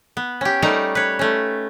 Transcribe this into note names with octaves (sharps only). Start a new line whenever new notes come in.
B3
C#4 G4
G3 A3 D#4 A#4 A#5
B4 C#5
A3 C#4